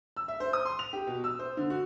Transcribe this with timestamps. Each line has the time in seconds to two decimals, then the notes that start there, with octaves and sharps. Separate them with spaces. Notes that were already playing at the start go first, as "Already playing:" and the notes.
0.17 E6
0.28 E5
0.40 C5
0.53 D#6
0.65 C6
0.79 F7
0.93 G4
1.07 B2
1.24 E6
1.39 C5
1.57 D3
1.70 F#4